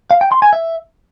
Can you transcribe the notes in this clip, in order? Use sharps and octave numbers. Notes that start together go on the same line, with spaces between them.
F5
G5
C6
G#5
E5